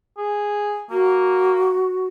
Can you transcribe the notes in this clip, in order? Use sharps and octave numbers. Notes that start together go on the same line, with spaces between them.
G#4
A#3 F#4